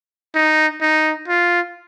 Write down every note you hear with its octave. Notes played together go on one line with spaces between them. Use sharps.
D#4
D#4
F4